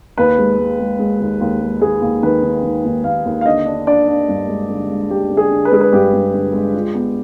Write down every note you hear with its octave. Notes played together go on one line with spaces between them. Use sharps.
D#2 B4
G#3
G#3
G#3
G#3
D#2
D#2
G#3
D#2 G#4
D#2
D#3 B4
D#3
D#3
D#2
D#2 F5
D#2
F5
D3 D#5
D4
D4 D5
D4
G2
G#3
D3
G#3
G#3 G4
D3
G#4
D3
B4
G#3 G#4
B4
G2 G4
G2
D3
G#3
F4
B3